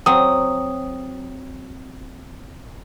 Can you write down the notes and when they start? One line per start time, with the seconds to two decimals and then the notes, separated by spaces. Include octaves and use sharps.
0.06 F#3 C4 D#6